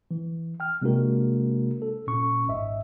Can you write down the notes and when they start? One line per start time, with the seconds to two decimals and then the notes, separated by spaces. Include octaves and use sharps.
0.11 E3
0.60 G5 F6
0.82 C3 G#3 A#3 D4 F#4 A#4
1.82 A4
2.07 A#2 C#4 C#6
2.47 G#1 G#2 D#5 E5